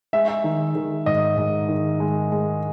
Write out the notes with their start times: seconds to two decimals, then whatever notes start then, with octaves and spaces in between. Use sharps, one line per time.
0.13 G#3 E5
0.28 E5
0.44 D#3
0.75 D#3
1.06 G#2 D#5
1.37 G#2
1.69 D#3
2.00 G#3
2.32 G#3